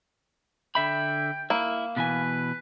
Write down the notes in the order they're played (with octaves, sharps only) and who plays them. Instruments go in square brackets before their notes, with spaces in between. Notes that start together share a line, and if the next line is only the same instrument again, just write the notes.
[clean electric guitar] D3 E5 B5 [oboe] G5
[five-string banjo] A#3 [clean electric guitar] E4
[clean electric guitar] B2 E3 G#5 [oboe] B4